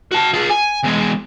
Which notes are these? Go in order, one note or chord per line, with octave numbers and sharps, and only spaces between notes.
F#4 A5
F4 G#4
G#5
E2 G#3